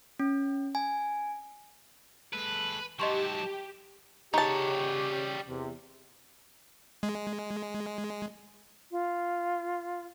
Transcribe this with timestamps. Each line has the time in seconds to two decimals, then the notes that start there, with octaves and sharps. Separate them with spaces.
0.19 C#4
0.75 G#5
2.33 G#3 A4 B4
3.00 G#2 F#3 G4 D#5 A5 C6 C#6
4.34 C#3 G3 D#4 G4 C#5 A5
5.47 E2 C3
7.03 G#3
8.91 F4